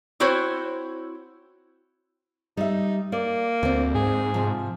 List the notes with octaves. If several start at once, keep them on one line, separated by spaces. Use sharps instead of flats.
C4 E4 F#4 C5 C#5
G3 D#4 E5
A#3 D5
D2 C4 D5
G#2 G#4
C3 F3